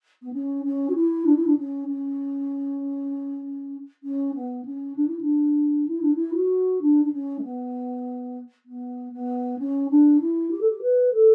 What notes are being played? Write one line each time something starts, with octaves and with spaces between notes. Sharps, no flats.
B3
C#4
C#4
F#4
E4
D4
E4
D4
C#4
C#4
C#4
B3
C#4
D4
E4
D4
E4
D4
E4
F#4
D4
D4
C#4
A3
B3
B3
B3
C#4
D4
E4
G4
A4
G4
B4
A4